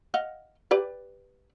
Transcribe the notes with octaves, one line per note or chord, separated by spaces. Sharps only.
D#5 F5 F#5
G4 B4 D5